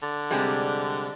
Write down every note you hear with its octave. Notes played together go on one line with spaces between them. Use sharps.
D3
C3 G3 G#3